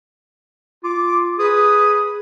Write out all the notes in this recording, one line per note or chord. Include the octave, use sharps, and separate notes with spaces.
F4 D6
G#4 B4 D#6